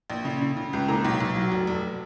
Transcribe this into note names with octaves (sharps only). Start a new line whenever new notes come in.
A#1
C#3
C#3
C#3
C#2
A#2 A#5
B1
B1
F#3
F1
F1